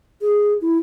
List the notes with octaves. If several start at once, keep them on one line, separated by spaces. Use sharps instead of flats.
G#4
E4